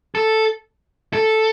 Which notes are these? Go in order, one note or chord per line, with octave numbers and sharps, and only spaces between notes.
A4
A4